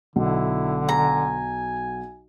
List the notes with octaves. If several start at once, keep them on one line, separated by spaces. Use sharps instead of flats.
B1 D3 E4
G#5 A#5